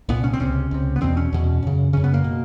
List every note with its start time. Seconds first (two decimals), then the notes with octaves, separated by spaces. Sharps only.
0.09 C2 A#2 B3
0.24 C#4
0.33 C4
0.40 C#2 C3 C#4
0.71 C#2 C3
0.96 B3
1.01 E2 B2 C4
1.17 C#4
1.33 E2 B2
1.62 F#2 C#3
1.93 F#2 C#3 C#4
2.04 B3
2.14 A#3
2.24 B2